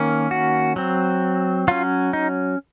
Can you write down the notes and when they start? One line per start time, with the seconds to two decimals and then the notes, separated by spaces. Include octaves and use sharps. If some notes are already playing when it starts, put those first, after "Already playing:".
Already playing: D#3 A#3 C#4
0.31 F#4
0.76 F#3 C4
1.68 F#3 C#4 F4
2.13 D#4